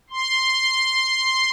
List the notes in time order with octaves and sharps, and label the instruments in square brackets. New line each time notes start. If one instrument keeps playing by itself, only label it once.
[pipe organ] C6